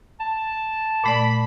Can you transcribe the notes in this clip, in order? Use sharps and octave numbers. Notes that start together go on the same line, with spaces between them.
A5
A#2 A3 D5 B5